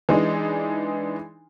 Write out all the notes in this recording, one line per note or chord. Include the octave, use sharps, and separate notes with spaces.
E3 G#3 D4 D#4